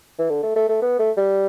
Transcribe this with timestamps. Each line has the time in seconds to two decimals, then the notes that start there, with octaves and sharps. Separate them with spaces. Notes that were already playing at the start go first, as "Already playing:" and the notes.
0.19 E3
0.29 D3
0.43 A3
0.56 A3
0.69 A3
0.82 B3
0.99 A3
1.17 G3